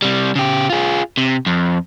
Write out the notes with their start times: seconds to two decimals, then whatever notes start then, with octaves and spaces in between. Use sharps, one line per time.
0.02 C3 G3
0.35 C#3 G4
0.70 F4 G#4
1.17 C3
1.46 F2